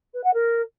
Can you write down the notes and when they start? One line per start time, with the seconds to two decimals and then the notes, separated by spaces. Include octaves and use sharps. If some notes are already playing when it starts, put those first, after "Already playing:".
0.14 B4
0.24 F#5
0.34 A#4